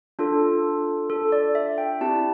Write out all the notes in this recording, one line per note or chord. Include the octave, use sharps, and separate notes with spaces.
D4 F4 A4
A4
D5
E5
G5
C4 E4 G4 A5